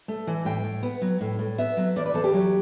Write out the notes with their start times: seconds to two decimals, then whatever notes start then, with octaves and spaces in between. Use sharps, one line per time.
0.08 A3
0.27 E3
0.45 A2 G5
0.64 A2
0.83 B3
1.02 F#3
1.21 A2
1.39 A2
1.58 B3 E5
1.77 F#3
1.96 E2 D5
2.06 B4
2.14 E2 A4
2.24 G4
2.34 F#3